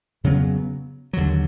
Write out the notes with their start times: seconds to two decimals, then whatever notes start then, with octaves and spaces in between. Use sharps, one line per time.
0.24 F2 C#3 F#3 B3
1.13 D#2 D3 F#3